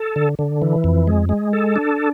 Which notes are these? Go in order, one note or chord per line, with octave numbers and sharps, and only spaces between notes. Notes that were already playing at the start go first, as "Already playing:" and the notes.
Already playing: A4
D3
D3
E3
F2
G#3
G#3
A4
D4